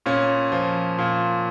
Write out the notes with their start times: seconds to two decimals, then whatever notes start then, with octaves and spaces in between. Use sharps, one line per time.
0.06 A#2 C#4
0.52 F3
0.98 A#2